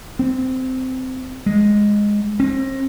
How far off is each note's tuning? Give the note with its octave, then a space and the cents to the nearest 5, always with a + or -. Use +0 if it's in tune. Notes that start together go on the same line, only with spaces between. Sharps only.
C4 -15
G#3 -5
C4 +35